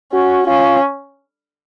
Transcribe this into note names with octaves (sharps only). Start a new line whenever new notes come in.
C#4 F#4
C#4 F4